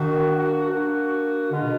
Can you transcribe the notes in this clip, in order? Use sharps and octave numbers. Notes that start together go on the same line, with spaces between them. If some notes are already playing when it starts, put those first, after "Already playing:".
Already playing: D#3 A#3 D4 F#4
A#3 D4 F#4
D3 G#3 D4 F4 B4 D#5
B2